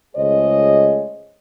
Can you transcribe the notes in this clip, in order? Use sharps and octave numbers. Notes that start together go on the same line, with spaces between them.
C#2 A3 G#4 C5 C#5 D#5